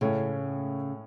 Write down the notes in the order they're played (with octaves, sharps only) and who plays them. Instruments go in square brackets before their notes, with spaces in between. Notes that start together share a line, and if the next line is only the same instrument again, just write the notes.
[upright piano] A2 A3 C#4 [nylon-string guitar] C#3